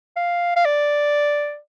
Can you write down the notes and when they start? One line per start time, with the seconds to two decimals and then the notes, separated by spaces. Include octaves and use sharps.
0.16 F5
0.56 F5
0.65 D5